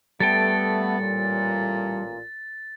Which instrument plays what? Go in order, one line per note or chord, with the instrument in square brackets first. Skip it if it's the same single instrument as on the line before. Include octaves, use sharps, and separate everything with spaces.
[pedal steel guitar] G3 A4 G5 [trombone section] A3 B3 [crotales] A6
[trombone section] A1 A#2